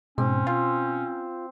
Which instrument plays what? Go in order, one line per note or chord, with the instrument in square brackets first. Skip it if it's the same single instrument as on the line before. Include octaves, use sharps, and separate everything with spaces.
[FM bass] G#2 [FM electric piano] B2 [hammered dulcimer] C4 [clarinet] C#4
[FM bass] F4 [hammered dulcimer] C5